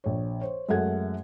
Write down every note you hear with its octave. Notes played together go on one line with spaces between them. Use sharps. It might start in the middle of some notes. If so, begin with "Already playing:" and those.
A#1 C#5
C5 C#5
F#2 G#3 A3 A4 F#5 G#6